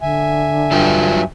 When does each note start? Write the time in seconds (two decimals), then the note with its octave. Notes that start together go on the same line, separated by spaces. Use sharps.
0.01 D3 E5 G#5
0.71 G2 F#3 F4 G5